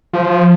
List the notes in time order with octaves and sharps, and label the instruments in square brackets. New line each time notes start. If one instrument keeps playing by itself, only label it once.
[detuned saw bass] F3